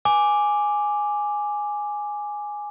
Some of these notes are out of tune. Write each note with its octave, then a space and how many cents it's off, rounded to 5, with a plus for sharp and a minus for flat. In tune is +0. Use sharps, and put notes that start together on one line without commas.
G#5 +0 D6 +0